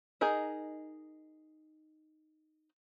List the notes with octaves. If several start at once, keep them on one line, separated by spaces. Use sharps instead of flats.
D#4 G#4 A#4 D#5